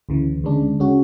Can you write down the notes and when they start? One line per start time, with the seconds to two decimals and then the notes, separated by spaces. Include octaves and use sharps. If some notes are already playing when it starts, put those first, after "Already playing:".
0.09 D2 C#3 E3
0.44 D2 C#3 G#3 D4
0.80 C#3 G#3 C#4 F#4